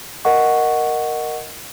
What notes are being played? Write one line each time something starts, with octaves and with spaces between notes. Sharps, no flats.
A#4 D#5 F#5 C#6